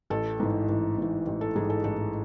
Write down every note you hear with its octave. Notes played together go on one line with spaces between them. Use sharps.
A1 A4
G#2 E3
A1
G#2 E3
A1
A4
G#2 E3 G#4
A4
A1 A4